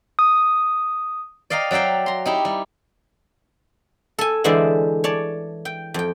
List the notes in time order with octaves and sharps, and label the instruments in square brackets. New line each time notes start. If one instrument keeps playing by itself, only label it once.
[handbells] D#6
[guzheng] D5 D#5 F5 G5 A#5
F#3 D5 E5 F5 G5
A#5 C6
D#4 E4 G4
G3
A4 G#5
D3 E3 G#3 E4 C5 D5
C#5 D5 A5
G5
F2 G5